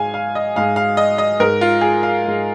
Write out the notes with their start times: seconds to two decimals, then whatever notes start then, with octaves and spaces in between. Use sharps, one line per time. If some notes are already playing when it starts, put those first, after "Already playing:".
Already playing: G#2 G#3 F5 G#5
0.14 F5
0.35 D#5
0.56 G#2 G#3 F5
0.76 F5
0.97 D#5
1.18 D#5
1.40 G#2 G#3 A#4
1.61 F4
1.81 G#4
2.03 F5
2.24 G#2 G#3